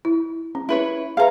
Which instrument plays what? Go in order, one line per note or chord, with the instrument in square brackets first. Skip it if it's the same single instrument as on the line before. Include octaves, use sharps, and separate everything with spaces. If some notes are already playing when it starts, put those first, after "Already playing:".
[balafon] E4
C#4
[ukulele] E4 B4 C#5
[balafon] G#4 B4 E5 [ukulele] F5 A#5